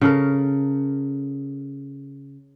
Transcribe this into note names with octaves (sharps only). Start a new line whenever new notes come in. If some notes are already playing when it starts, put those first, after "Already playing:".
C#3 A4 A#4